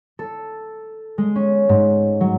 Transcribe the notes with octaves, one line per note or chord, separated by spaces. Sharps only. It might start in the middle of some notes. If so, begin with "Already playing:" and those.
A4
G#3
C#4
G#2
F#3